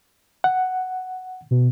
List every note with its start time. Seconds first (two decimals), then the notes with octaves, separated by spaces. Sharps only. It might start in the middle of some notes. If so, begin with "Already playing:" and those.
0.44 F#5
1.51 B2